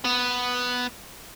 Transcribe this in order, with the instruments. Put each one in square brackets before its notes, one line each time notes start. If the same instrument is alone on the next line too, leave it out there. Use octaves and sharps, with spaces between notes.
[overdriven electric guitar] B3